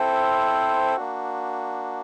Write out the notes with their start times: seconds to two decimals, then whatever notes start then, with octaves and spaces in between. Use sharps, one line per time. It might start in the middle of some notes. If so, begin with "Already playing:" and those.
Already playing: C4 E4 A4 C5
0.97 A#3 D4 F#4